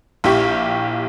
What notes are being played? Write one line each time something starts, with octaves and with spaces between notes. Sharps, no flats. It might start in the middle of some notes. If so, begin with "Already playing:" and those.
A#1 E4 G4 C#6